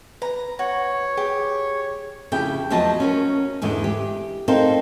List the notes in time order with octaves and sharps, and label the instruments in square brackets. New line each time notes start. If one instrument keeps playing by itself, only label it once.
[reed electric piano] B4 [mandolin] A#5
[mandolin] F#4 [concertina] C#5
[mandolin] G4 [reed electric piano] G#4
[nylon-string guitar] F2 C#3 E4 G4 G5
E2 F3 F#3 B4 D#5 A5
C#4 F#4 A#4
E2 G#2 D3 E3
G4
C4 D#4 A4 A#4 C5 F5